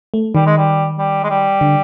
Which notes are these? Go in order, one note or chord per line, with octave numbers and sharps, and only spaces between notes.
A3
D#3 G3
G#3
G3
G3
G#3
G3
D3